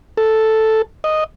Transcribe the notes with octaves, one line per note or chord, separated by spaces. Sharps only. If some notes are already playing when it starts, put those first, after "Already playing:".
A4
D#5